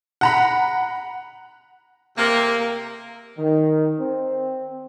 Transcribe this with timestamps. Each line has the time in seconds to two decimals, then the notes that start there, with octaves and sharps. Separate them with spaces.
0.21 F#5 A#5 B5
2.18 C3 A#3 A#4
3.38 D#3
4.00 C4